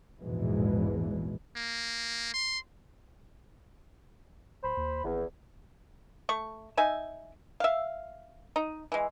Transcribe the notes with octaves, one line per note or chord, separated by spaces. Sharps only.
A#1 E2 G#2 B2 E3 G#3
A#3
C6
D1 C5 B5
D#2
G#1 E2
A3 C#6
D#4 E5 G#5
E5 F5
D#4
E3 G#3